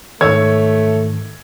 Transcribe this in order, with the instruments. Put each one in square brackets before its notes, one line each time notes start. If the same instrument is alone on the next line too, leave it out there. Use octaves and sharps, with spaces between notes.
[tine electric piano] G#2 D#3 [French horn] A3 [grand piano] C#5 E6 G#6